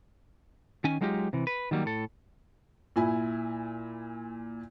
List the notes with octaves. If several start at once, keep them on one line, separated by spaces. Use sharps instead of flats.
D#3 C#4 G#5
F#3 G#3 D#4 F4 G4
C3 E3
B4
D#3 F#3 G3 A#3
A2 A4
A#2 E4 G#5 B5